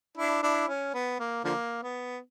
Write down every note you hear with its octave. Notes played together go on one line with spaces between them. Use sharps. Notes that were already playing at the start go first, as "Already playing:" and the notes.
D4 E4
D4 E4
C#4
B3
A#3
D3 F3 A#3
B3